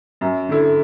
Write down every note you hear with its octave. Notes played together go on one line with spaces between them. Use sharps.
F#2
D3 A3 E4